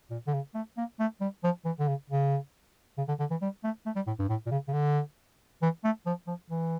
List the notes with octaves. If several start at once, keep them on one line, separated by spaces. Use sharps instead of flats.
A#2
D3
C#3
A3
A#3
A3
G3
F3
E3
D3
C#3
C#3
C#3
D3
D3
E3
G3
A3
A3
G3
A2
G2
A2
A#2
C#3
C#3
D3
E3
A3
F3
F3
E3